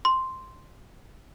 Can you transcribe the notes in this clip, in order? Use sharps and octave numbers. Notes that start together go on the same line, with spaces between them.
C6